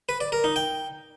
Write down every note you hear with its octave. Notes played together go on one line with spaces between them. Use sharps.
B4
D5
A#4
D#4
G5